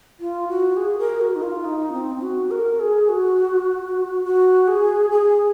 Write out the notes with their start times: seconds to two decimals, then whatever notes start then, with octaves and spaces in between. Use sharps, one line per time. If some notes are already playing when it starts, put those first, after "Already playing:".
0.20 F4
0.49 F#4
0.77 G#4
0.98 A#4
1.21 F#4
1.36 D#4
1.42 F4
1.65 D#4
1.93 C4
2.21 F#4
2.51 A#4
2.80 G#4
3.09 F#4
4.24 F#4
4.68 G#4
5.11 G#4